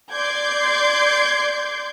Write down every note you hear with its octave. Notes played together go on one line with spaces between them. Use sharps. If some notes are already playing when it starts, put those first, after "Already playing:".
D5 C6 D6 G6 G#6